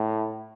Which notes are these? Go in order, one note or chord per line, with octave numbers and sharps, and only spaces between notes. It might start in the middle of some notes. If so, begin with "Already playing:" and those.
Already playing: A2